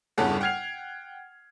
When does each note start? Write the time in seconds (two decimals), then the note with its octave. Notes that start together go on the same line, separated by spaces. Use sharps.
0.18 G1 E2 G2 C#3 A4 F#5
0.40 F#5 G5 F6 G#6 C7 F7